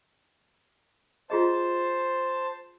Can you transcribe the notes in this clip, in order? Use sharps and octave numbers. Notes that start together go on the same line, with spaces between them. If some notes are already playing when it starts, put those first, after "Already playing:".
F4 G#4 C5 D#5 A5